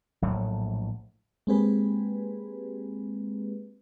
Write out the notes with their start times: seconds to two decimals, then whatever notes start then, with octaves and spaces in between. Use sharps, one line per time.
0.22 A#1 A2 F#3 A3
1.47 G#3 A#3 C4 G4 G#4 B4